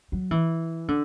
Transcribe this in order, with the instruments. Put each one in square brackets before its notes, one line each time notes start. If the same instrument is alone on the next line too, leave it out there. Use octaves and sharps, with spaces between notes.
[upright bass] F#3
E3
D3